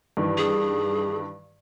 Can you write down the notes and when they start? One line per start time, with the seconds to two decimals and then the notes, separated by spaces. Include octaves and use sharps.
0.17 G2 D#3 E3
0.37 G#4